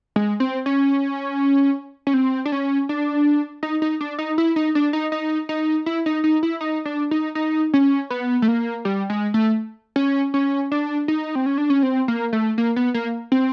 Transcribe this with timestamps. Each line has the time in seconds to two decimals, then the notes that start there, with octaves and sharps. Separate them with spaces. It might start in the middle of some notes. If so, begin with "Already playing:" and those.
0.16 G#3
0.40 C4
0.66 C#4
2.07 C#4
2.14 C4
2.45 D4
2.52 C#4
2.89 D4
3.63 D#4
3.82 D#4
4.01 D4
4.19 D#4
4.38 E4
4.56 D#4
4.75 D4
4.93 D#4
5.12 D#4
5.49 D#4
5.86 E4
6.06 D#4
6.24 D#4
6.43 E4
6.61 D#4
6.85 D4
7.11 D#4
7.35 D#4
7.74 C#4
8.10 B3
8.42 A3
8.48 A#3
8.85 G3
9.10 G#3
9.34 A3
9.96 C#4
10.34 C#4
10.72 D4
11.08 D#4
11.35 C4
11.46 C#4
11.58 D4
11.70 C#4
11.83 C4
12.08 A#3
12.33 A3
12.58 A#3
12.76 B3
12.94 A#3
13.32 C4